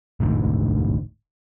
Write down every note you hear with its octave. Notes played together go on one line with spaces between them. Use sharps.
E1 A1 D2 G#2